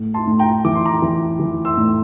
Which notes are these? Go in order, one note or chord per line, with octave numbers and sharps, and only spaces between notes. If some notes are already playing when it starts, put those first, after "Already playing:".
Already playing: A2
A5 C6
A2
G5 A#5
E3 D6
C6
A#5 D6
E3
E3
C6 E6
A2